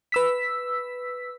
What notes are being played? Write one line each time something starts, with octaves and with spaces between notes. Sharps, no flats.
B4 E6 B6